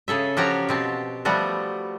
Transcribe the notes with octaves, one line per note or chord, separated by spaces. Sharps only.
C#3 G#4 A4 E5
F3 F#4 G4 C#5 F5 A#5
B2 C4 A5
F3 G3 A3 B3 F#4